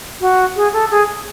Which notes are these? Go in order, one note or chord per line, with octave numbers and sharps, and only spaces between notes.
F#4
G#4
A4
G#4